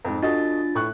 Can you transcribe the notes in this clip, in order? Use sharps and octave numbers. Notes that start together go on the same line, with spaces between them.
F2 G#2
D4 F4 F#4 A4 D#5 A6
A2 C#6 F#6